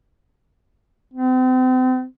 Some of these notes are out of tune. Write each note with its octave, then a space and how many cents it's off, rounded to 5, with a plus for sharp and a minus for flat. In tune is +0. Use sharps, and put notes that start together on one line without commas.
C4 -40